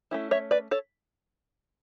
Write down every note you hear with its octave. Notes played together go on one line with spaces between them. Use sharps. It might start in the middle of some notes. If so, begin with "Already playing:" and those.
A3 C#4 E4
C#5 E5
B4 D5
A4 C#5